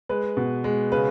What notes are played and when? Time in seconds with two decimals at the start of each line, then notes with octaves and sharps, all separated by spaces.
0.09 G#3 B4
0.37 B2
0.64 G#3
0.92 C#3 B4